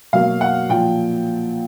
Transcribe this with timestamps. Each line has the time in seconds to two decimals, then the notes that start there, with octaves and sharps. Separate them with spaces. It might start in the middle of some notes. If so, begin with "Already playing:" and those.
0.13 B2 F#3 A#3 F5
0.41 F#5
0.69 A#2 F3 G5